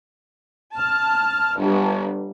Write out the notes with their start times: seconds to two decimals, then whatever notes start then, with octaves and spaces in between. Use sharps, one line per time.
0.75 A5 F6
1.58 G1 G3